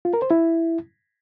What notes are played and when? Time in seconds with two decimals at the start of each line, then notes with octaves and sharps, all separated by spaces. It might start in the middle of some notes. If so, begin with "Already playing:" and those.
0.05 F4
0.14 A#4
0.22 C5
0.31 E4